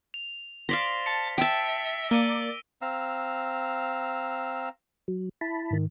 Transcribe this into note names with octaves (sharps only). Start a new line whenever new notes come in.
F7
C5 D5 F5 A#6 B6 G7
A5 C#7
E5 G5 A5 E6 D7
A#3 D5 C#7 D#7 G7
C4 F5 A#5 E6
F#3
E4 A5 B5
G#2 D#3